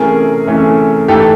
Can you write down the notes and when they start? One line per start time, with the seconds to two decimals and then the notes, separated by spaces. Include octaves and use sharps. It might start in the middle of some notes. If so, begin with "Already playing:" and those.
Already playing: C3 E3 A3 C#4 G#4 A#4
0.46 C3 E3 A3 C#4
1.08 G#2 E3 A3 G4 A4